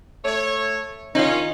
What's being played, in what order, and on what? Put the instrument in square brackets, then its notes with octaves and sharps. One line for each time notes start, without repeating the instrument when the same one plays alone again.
[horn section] A3 C#5
[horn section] D#3 C#4 [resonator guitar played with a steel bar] D#4 F4